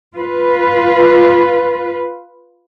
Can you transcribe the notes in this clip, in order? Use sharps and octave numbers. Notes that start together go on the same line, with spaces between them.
F4 B4